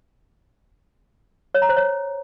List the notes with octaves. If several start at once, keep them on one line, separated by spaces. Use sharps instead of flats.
C#5
A#5
C5
C#5